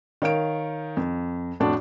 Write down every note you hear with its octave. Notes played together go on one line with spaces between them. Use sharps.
D#3 C#5 F5 D7
F2
F2 A2 D4 F#4 D5